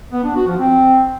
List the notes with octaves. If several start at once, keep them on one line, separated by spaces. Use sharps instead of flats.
B3
D4
F#4
F3
C4